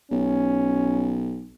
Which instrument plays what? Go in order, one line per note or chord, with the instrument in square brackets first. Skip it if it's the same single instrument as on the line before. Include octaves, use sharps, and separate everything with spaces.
[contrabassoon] B1 [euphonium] C#4